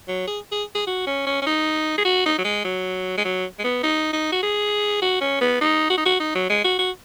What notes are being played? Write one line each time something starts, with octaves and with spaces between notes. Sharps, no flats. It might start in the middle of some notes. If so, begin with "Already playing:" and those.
F#3
G#4
G#4
G#4
F#4
C#4
C#4
C#4
D#4
G#4
F#4
D#4
F#3
G#3
F#3
G#3
F#3
G#3
B3
D#4
D#4
F#4
G#4
F#4
C#4
B3
D#4
F#4
D#4
F#4
D#4
F#3
G#3
F#4
F#4